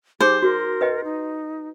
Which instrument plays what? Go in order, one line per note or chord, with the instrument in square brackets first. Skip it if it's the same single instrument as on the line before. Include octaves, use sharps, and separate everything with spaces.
[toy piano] D#4 G#4 D6 [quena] G4 [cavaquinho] C5
[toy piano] F#4 [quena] A#4
[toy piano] B4 D#5 G5
[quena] D#4